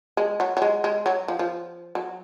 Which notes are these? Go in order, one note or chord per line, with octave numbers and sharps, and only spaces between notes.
G#3
F#3
F#3
G#3
G#3
F#3
F3
F3
F#3